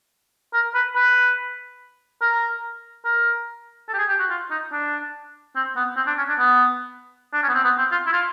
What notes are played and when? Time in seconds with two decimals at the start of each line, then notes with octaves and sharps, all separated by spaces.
0.54 A#4
0.75 B4
0.96 B4
2.21 A#4
3.05 A#4
3.88 A4
3.94 G4
3.98 G#4
4.09 G4
4.19 F#4
4.30 F4
4.51 D#4
4.72 D4
5.56 C4
5.76 B3
5.97 C4
6.07 D4
6.18 C#4
6.28 D4
6.39 B3
7.33 D4
7.43 C#4
7.49 B3
7.54 C4
7.64 B3
7.78 C4
7.92 F4
8.06 E4
8.13 F4